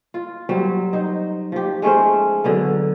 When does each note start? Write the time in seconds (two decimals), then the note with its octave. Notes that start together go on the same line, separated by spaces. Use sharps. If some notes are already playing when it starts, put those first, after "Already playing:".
0.14 F4
0.49 F#3 G3 C4
0.93 D#4 C5
1.52 F3 G4
1.82 G#3 A3 C#4 C5
2.44 D3 F#3 B3